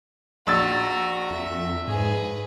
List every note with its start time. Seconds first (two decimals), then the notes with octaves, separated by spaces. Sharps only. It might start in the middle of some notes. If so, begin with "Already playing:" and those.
0.47 A#1 F#4 A#5 E6 A6
1.31 F2 E5
1.88 G#2 G#4 B4